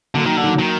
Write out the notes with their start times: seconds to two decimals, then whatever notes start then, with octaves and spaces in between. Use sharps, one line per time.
0.14 D3 F#3 A#3
0.26 D#3
0.37 D3
0.44 D#3 F#3
0.59 D#3